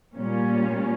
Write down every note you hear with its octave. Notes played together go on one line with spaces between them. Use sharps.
A#2 G3 C#4